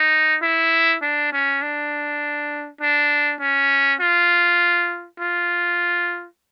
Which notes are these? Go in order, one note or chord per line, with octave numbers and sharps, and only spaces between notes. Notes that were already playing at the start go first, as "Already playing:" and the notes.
Already playing: D#4
E4
D4
C#4
D4
D4
C#4
F4
F4